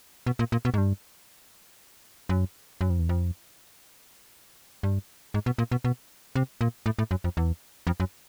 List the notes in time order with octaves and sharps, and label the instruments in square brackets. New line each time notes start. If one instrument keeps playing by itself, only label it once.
[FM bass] B2
A#2
A#2
B2
G#2
G2
F#2
F#2
F2
E2
F2
G2
G#2
B2
A#2
B2
B2
C3
A#2
A2
A2
F#2
F2
E2
F2
F#2